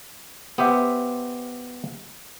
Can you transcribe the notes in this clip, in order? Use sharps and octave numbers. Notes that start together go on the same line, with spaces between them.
B3 G4 C5 E5